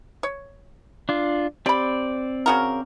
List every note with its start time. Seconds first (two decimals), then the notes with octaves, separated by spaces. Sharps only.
0.23 C#5
1.09 D4 F4
1.66 C4 G4 D5 B5
2.46 C#3 F#4 A#4